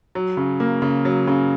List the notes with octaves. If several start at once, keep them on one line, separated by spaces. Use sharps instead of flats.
F#3
C#3
A#3
C#3
F#3
C#3